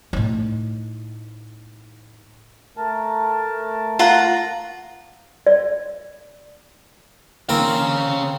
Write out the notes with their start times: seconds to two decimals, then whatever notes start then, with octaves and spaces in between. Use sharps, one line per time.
0.13 A2 D#4
2.77 A3 A#4 A5
3.99 F4 F#5 A#5
5.47 D5
7.49 D3 E3 A#3 C4 C#4 A#4 F5